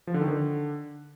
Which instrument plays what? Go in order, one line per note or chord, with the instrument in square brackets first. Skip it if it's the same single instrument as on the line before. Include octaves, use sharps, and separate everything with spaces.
[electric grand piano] F3
D3
D#3
D3